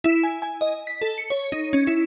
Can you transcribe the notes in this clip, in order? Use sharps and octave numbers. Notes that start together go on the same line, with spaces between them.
E4
G#5
G#5
D#5
B6
A4
C#7
C#5
D#4
C#4
E4